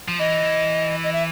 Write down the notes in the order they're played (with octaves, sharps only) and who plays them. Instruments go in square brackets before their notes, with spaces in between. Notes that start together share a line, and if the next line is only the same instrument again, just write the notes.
[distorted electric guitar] F3
[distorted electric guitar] E3 [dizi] D#5
[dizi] D#5
E5